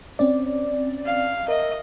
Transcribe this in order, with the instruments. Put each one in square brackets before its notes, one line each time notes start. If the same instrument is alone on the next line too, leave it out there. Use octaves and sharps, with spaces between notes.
[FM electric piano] C4 C#4 D5
[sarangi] F5
[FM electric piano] A#4 E5 [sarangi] D#5